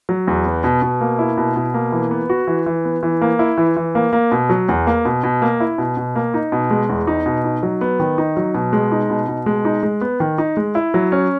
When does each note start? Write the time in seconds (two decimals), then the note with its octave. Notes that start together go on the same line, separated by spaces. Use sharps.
0.09 F#3
0.27 E2
0.45 B3
0.64 B2
0.82 B2
1.01 A#3
1.19 E4
1.37 B2
1.56 B2
1.74 A#3
1.92 E3
2.11 B3
2.29 F#4
2.47 E3
2.66 E3
2.85 B3
3.03 E3
3.21 A#3
3.39 E4
3.58 E3
3.76 E3
3.95 A#3
4.13 A#3
4.32 B2
4.49 F#3
4.69 E2
4.87 A#3
5.05 B2
5.24 B2
5.42 A#3
5.60 E4
5.78 B2
5.97 B2
6.15 A#3
6.34 D#4
6.52 B2
6.71 G#3
6.89 E2
7.07 D#4
7.26 B2
7.44 D#4
7.63 F#3
7.81 B3
8.00 D#3
8.18 D#4
8.37 F#3
8.55 B2
8.73 G#3
8.92 D#4
9.10 B2
9.28 B2
9.46 G#3
9.65 D#4
9.83 G#3
10.01 B3
10.20 D#3
10.38 D#4
10.57 G#3
10.75 E4
10.94 F#3
11.12 C#4